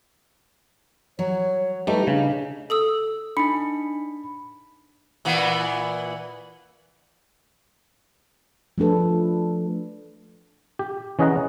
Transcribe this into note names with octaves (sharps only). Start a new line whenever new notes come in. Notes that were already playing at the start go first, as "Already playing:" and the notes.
F#3 C#5
G3 A3 D#4 B4
C#3 D4
A4 D#6 E6
D4 D#4 B5 C#7
A#2 E3 B3
F3 A3 D4 A4 B4
G4
E3 C#4 G#4 D#5 F#5 A#5